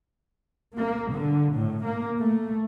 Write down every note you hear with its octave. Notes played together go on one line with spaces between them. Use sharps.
A#3
D3
A2
A#3
A3